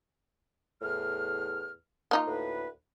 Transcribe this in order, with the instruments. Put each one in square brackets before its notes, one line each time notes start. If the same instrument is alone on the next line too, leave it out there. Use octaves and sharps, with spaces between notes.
[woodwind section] E2 A2 F6
[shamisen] A#3 D#4 F4
[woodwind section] D2 A2 B4